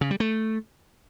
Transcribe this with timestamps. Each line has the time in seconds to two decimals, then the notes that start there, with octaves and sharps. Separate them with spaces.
0.01 C#3
0.11 G3
0.20 A3